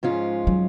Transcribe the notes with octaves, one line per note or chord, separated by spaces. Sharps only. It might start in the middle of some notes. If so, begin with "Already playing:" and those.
G#2 F3 G#3 C#4 F4
F#3